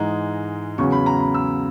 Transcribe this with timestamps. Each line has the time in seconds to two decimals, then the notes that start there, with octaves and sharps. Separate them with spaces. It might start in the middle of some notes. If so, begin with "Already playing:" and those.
Already playing: G#2 E3 G#3 D#4 A#5
0.78 E2 C#3 F#3 C#4 C#6
0.92 B5
1.06 A#5
1.20 B5
1.34 E6